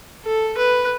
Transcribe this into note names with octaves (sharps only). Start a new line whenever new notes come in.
A4
B4